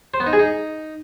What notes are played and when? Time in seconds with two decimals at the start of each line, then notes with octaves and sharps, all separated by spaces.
0.14 C5
0.20 B3
0.26 D#4
0.33 G#4
0.39 D#4